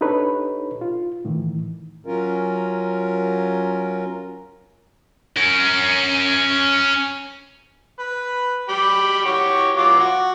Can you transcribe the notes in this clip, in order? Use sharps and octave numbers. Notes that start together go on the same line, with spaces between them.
D4 D#4 G4 A4 B4 C#5
F4
A2 D#3 E3
F#3 C#4 F4 A#4
C#4 A#4
B4
G4 B5
F#4 G4 C#5
F#3 F4 D6
F#4